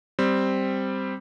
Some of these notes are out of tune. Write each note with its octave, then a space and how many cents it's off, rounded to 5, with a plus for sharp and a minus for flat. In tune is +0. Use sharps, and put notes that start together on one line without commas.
G3 +0 C4 +0